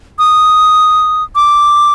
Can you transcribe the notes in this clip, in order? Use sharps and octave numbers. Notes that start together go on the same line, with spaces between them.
D#6
D6